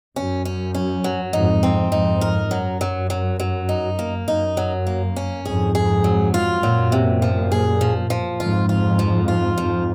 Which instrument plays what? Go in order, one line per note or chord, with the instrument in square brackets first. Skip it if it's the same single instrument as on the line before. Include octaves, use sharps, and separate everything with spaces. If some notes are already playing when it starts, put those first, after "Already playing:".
[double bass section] F#2 [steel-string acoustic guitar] C#4
[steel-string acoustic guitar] C#4
C#4
F#3
[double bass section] F2 G#2 [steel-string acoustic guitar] D#4
[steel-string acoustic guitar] C4
[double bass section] F2 G#2 [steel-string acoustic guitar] D#4
[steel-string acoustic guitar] A#4
[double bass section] F#2 [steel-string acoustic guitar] F#3
[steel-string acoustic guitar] F#3
F#3
F#3
D#4
A#3
[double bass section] F#2 [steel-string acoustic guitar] D#4
[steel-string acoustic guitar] F#3
A#3
C#4
[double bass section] F2 G#2 [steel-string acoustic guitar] G#4
[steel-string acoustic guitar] G#4
F#3
F4
[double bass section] F#2 A#2 [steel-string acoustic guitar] F#3
[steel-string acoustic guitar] C3
F3
G#4
F3
F3
[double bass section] F2 G#2 [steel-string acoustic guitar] F4
[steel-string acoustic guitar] F4
F3
F4
[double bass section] F2 G#2 [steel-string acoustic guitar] F3